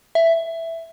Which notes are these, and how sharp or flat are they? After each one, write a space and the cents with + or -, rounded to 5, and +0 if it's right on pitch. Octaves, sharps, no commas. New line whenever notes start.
E5 +5